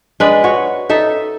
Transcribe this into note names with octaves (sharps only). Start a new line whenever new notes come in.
G#3 D4 B4
F#4 C#5
D#4 A4 E5